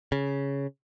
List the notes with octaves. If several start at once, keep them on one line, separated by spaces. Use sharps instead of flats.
C#3